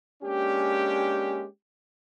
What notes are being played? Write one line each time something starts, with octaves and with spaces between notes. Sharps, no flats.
G#3 A#3 C#4 D4 G4